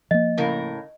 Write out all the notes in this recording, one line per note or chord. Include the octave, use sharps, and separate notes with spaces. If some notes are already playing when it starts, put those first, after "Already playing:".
F3 A#3 D#5
A2 C#3 A#4